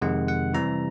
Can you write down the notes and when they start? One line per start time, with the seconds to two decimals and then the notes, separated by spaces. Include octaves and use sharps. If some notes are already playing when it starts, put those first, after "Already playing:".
0.02 F2 C3 D#3 G#3 F#5
0.28 F#5
0.54 C3 E3 G3 A#5